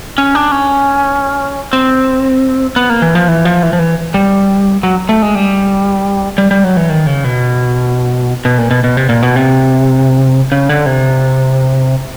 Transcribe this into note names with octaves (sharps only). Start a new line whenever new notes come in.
C#4
D4
C#4
C4
B3
A#3
E3
F3
E3
F3
E3
F3
E3
G3
F#3
A3
G#3
G3
G3
G3
F#3
E3
D#3
C#3
B2
B2
A#2
B2
B2
C3
A#2
B2
C3
C#3
D3
C3